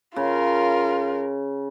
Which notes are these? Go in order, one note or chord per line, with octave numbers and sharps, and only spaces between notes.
C#3 F4 A#4